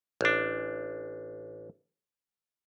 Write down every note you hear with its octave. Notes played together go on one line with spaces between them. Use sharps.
A1 D4